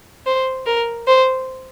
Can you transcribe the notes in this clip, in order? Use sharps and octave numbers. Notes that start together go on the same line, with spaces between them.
C5
A#4
C5